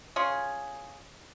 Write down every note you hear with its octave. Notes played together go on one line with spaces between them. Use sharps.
C#4 F4 G#4